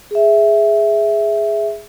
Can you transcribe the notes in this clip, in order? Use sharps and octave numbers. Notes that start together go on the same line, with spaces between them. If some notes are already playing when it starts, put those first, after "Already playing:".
G#4 E5